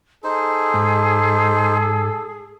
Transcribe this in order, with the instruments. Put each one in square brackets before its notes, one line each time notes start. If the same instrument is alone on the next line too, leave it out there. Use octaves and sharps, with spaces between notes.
[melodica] D#4 C5 [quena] G#4 [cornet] A4
[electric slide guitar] G#2